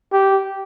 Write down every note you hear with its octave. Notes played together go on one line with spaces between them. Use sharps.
G4